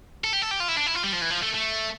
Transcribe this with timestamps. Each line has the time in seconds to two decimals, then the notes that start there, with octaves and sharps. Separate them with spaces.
0.24 A4
0.33 G4
0.42 A4
0.51 G4
0.60 F4
0.68 E4
0.77 D4
0.87 E4
0.95 F4
1.04 G3
1.13 F3
1.22 E3
1.30 F3
1.43 A3
1.54 A3